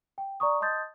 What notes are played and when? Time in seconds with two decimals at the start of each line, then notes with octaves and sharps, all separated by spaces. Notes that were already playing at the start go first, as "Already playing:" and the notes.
0.18 G5
0.40 D5 A#5 C#6 D#6
0.61 D#5 A5 C6 D#6 G6 A6